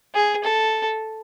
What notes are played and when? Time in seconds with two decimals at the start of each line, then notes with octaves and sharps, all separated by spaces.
0.15 G#4
0.44 A4